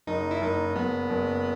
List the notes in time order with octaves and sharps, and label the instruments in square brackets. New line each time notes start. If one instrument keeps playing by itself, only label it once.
[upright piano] F#1 [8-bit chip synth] D#4
[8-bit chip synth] E4
[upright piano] F#1 [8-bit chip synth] D#4
[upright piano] F#1 [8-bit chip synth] B3
[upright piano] F#1